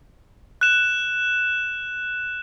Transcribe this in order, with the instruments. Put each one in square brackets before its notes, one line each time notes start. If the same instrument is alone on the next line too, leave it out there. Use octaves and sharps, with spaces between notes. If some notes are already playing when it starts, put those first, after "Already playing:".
[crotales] F#6 E7